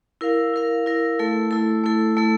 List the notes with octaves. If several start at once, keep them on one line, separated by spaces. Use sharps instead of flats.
E4 A#4 F5
E4 A#4 F5
E4 A#4 F5
A3 E4 A4
A3 E4 A4
A3 E4 A4
A3 E4 A4